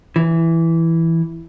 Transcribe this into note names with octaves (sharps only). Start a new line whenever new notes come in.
E3